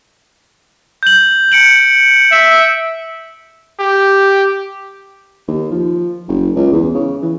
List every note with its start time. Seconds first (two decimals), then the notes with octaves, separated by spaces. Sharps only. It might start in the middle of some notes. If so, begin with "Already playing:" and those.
1.03 G6 F#7
1.52 C#7 D7 F#7
2.31 E5
3.80 G4
5.48 D#2
5.71 F3
6.28 F#1
6.56 C#2
6.72 E2
6.95 C#3
7.22 E3